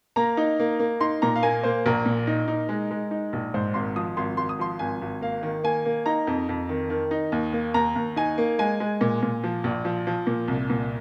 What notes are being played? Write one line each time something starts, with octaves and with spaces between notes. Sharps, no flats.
A#3 A#5
D#4
A#3
A#3
D#4 C6
A#2 A#5
F5
A#3 G#5
A#3 C5
A#1 A#4
A#2
D#4
D#4
G#3
G#3
D#4
A#1
G#2 C5
G#1 C6
F3 D#6
G#1 C6
G#1 C6
D#6
F3 C6
G#1 G#5
G#1
A#3 F5
D#3
A#3 G#5
A#3
D#4 A#5
F2
F2
D#3
D#3
D#4
D#2
A#3
D#2 A#5
D#2
D#4 G#5
A#3
G#3 G#5
G#3
A#2
A#2
F3
A#1
F3
F3
A#2
C2
A#2